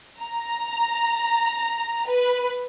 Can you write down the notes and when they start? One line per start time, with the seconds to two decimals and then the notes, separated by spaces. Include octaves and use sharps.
0.21 A#5
2.09 B4